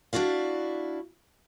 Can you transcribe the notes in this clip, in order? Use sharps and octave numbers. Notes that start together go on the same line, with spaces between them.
D4 E4 F#4 D5 F5